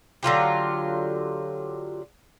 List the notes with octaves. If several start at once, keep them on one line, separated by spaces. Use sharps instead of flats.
D3 F#3 F4 G4